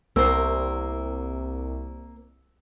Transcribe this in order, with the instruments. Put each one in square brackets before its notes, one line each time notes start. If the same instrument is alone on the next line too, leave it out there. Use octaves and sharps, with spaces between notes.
[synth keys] C2 [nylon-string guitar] A#3 C5 [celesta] E6